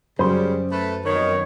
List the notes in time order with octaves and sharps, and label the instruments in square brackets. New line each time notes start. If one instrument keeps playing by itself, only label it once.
[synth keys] F#2 [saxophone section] C#3 G3 [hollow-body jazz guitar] C5 B5 C6
[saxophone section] A3 B4
[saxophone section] F2 B2 D#3 [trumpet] C#5